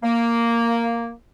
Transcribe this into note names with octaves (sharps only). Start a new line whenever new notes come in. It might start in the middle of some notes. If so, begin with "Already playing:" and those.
A#3